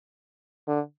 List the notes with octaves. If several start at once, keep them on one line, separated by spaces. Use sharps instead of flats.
D3